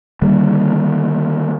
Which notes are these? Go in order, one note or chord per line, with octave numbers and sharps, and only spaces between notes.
D3 D#3 G3 A#3